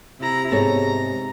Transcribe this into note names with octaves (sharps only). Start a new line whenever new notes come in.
C3 E4 A#5
G#2 B3 G#4 A4 C#5 A#5